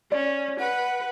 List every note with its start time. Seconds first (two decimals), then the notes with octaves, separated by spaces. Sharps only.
0.12 C#4 D5
0.59 B4 F#5